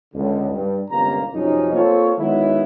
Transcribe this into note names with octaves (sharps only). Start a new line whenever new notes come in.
C#2 D3
G2
G1 C#2 C3 A#3 A#5
F#2 C3 F3 C#4 D#4
A#3 C4 F4 A4 C#5
D#3 F#3 G#3 B3 E4